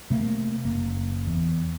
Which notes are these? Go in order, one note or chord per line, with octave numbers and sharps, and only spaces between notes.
C3 A3 A#3
F#1 A#3
E2